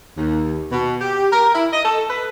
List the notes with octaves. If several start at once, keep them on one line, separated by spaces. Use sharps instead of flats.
D#2
B2
G4
A#4
E4
D#5
A4
B4